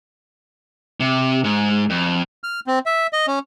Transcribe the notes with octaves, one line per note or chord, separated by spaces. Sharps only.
C3
G#2
F2
F6
C4
E5
D#5
C#4